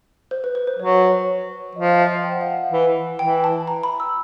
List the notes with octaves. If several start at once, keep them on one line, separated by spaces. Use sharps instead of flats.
C5
B4
B4
C5
F#3 C#5
F3 D#5
D#5
E5
G5
F#5
F5
F#5
E3
E3 G5
A5
A#5
B5
E6